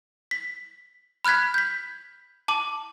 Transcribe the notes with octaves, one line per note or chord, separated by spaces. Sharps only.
B6
B5 F6 F#6 G#6 B6
G6 B6
A5 D6 F#7